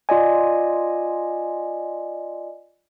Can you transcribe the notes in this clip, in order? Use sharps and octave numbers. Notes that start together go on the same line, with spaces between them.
F4 D5 D#5 G#5